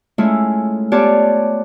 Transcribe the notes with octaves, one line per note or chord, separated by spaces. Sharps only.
G#3 A3 C#4 E4 F4
B3 F4 G4 C#5 D5 A5